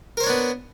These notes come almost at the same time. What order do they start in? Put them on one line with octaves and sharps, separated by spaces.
A#4 C5 C#5 D4 B3